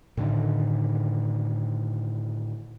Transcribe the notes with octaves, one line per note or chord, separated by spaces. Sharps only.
A2 D3 D#3